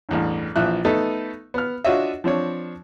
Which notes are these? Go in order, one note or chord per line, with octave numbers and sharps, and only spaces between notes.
A1 E2 G2
A#1 E3 F3 E5 F#6
A3 B3 D#4 A4
B3 F6
D4 F4 F#4 C#5 D#5 E5
F3 C4 D4 C#5